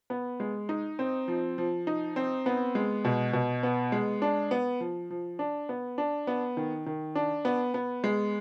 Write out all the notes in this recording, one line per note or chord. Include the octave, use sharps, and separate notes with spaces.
B3
G#3
D#4
C4
F3
F3
D#4
C4
B3
G#3
B2
B2
B3
G#3
D4
B3
F3
F3
D4
B3
D4
B3
D#3
D#3
D4
B3
B3
G#3